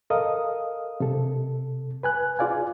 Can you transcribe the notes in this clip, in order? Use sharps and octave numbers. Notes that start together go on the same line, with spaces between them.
A4 A#4 D#5 F5 D#6
C3 A4
B4 G#5 F#6
F4 G#4 D5 F5 G#5